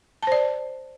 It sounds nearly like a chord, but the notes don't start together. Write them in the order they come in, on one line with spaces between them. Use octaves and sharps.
A5 C5 D5